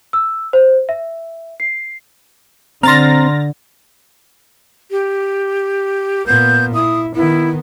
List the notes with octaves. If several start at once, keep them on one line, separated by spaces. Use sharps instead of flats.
E6
C5
E5
C7
D3 C4 A#5 C6 F6 A6 A#6
G4
A#2 B3 G6
E4 D#6
D#3 B3 E4